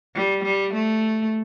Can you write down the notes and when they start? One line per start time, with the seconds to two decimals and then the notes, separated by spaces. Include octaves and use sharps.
0.15 G3
0.45 G3
0.74 A3